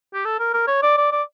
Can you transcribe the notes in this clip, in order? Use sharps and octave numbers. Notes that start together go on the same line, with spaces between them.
G4
A4
A#4
A#4
C#5
D5
D5
D5